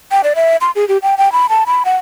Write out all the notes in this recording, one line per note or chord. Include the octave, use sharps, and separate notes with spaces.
G5
D5
E5
C6
G#4
G4
G5
G5
B5
A5
B5
F#5